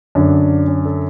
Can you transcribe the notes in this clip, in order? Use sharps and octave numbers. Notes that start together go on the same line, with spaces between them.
F#2 D3 D4
C#4
A4